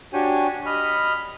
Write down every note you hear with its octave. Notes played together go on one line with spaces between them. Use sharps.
D4 F#4 G4 C#5 G5 G#5
D#5 B5 F6